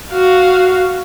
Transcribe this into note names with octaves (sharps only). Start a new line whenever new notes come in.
F#4 F5